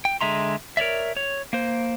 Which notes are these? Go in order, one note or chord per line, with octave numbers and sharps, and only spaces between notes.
G5
D3 G#3 E5 A#5 C6
A#4 C#5 D5 E5
C#5
A#3 C5